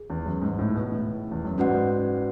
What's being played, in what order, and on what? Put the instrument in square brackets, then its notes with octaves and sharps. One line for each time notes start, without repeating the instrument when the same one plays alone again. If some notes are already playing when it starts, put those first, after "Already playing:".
Already playing: [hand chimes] G#4
[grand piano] E2
F#2
G#2
A2
B2
A2
E2
F#2
[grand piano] G#2 [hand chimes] C#4 F#4 B4 D5 F#5